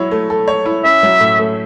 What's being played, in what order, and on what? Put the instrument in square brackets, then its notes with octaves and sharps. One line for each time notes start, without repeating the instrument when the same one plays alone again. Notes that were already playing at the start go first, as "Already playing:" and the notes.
Already playing: [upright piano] F#3 E4 C#5
A3
A4
C#5
E4
[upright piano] C#4 [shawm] E5
[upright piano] F#3
A2
A3